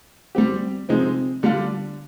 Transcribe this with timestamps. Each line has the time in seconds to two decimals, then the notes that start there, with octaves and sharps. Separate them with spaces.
0.35 G3 C4 G4
0.89 C3 F3 G#3 C4 D#4
1.43 D3 G3 D4 F4